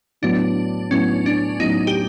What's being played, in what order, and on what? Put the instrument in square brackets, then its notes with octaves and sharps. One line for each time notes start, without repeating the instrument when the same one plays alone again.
[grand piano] A2 F#3 B3 [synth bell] D4
[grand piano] A2 F#3 B3 [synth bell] C#4
[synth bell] D4
[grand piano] A2 F#3 B3 [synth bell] D#4
[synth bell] G4